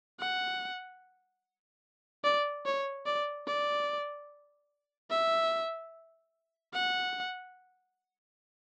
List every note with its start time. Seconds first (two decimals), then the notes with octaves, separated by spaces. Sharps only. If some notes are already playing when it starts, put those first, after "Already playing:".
0.19 F#5
2.24 D5
2.65 C#5
3.06 D5
3.47 D5
5.10 E5
6.74 F#5